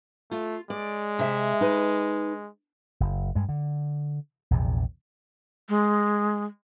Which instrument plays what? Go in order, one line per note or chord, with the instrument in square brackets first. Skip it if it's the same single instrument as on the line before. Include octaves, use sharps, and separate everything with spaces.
[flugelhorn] A3 [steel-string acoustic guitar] F4
[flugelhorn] G#3 [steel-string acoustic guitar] D5
[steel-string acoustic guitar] C3 E5
D#4 B4
[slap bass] F#1
G2 G#3
D3
A#1 E2 C3
[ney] G#3